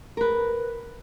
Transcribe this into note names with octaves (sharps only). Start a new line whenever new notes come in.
A#4 B4